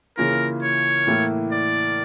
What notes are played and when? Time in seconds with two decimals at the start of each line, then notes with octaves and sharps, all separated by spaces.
0.17 C#3 E3 A#3 C#4 F4 A#4
0.63 C#5
1.07 A2 E3 A#3 E4
1.52 D5